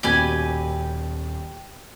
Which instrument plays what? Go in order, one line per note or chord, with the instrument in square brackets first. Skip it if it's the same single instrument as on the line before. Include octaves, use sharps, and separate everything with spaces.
[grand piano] D#1 D#2 B2 [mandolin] G4 B4 G#5